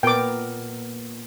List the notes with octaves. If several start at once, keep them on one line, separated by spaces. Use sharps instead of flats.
A#2 B3 A#4 G5 D6